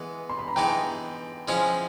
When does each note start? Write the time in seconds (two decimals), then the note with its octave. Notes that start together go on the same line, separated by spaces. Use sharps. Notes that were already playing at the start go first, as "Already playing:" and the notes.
Already playing: E3 G#3 B3
0.29 C6
0.39 B5
0.48 A#5
0.56 E3 G#3 B3 D#4 G5 A5
1.48 F3 G#3 C#4 E4